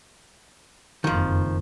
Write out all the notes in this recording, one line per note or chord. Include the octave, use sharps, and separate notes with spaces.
F#1 F2 D#3 F3